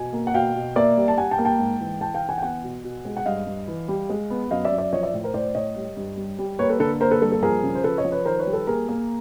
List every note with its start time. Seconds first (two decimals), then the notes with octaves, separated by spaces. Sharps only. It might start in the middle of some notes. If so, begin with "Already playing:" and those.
Already playing: B2 G#5
0.13 A#3
0.27 F#5
0.34 B2 F5 G5
0.55 B2
0.76 A#3 D5 E5
0.97 G3
1.08 A5
1.18 G3 F#5 G#5
1.31 G5 A5
1.38 A#3
1.45 G5 A5
1.59 G#2
1.81 E3
2.01 E3 G5 A5
2.14 F5 G5
2.22 E3
2.29 F#5 G#5
2.38 G5
2.42 B3 F#5 G#5
2.63 B2
2.84 B2
3.05 G#3
3.17 F#5
3.26 G2 D#5 F5
3.46 G2
3.68 E3
3.88 G3
4.10 G#3
4.30 B3
4.51 F#2 D#5 F5
4.65 D5 E5
4.72 F#2
4.78 D5 E5
4.93 F3 C#5 D#5
5.03 D5 E5
5.13 A2
5.24 A#4 C5
5.34 A2 C5 D5
5.55 A2 C#5 D#5
5.76 G3
5.97 G2
6.17 G3
6.39 G3
6.59 A#3 B4 C#5
6.69 A4 B4
6.80 D3 A4 B4
7.01 A#3 A#4 C5
7.11 A4 B4
7.22 G2 A4
7.32 A4
7.43 F3 G#4 A#4
7.63 C#3
7.75 C5
7.84 F3 A4 B4
7.98 C#5 D#5
8.05 F3
8.12 B4 C#5
8.25 D#3 A#4 C5
8.39 B4 C#5
8.47 G3
8.53 A4 B4
8.67 A#3 G#4 A#4
8.88 A#3